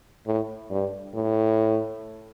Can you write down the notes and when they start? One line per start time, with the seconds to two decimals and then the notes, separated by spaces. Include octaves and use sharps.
0.26 A2
0.70 G2
1.14 A2